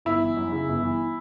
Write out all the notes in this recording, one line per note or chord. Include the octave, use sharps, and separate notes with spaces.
G1 E4
E3
F#2
C#3
G1
E3